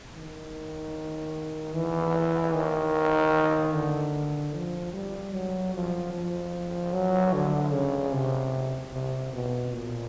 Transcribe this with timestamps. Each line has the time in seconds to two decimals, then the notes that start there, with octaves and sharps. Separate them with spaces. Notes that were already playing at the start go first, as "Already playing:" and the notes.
0.15 D#3
1.75 E3
2.54 D#3
3.74 D3
4.55 F3
4.94 G3
5.34 F#3
5.74 F3
6.14 F3
6.93 F#3
7.33 D3
7.73 C#3
8.13 C3
8.93 C3
9.33 B2
9.73 A#2